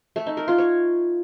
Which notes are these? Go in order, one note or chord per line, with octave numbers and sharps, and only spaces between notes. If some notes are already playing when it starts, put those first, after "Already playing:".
A3
D#4
A#4
F4
C#5